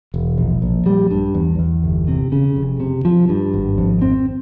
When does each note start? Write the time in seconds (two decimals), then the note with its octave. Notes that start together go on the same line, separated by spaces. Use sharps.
0.14 E1
0.38 A#1
0.62 A#1
0.86 G3
1.11 G2
1.34 E2
1.59 E2
1.84 G1
2.08 C3
2.32 C#3
2.56 F1
2.80 C3
3.05 F3
3.29 G2
3.54 G#1
3.78 F2
4.02 C4